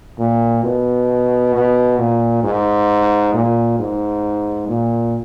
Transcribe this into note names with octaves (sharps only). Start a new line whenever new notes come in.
A#2
B2
B2
A#2
G#2
A#2
G#2
A#2